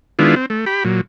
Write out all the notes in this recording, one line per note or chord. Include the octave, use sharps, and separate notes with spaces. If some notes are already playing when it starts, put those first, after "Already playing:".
D#3 G#3 B3 D4 E4 F4
C4
A3
G4 B5
A#2 F#3